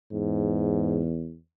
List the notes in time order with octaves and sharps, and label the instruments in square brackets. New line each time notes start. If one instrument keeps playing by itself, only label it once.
[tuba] E2 [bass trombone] G#2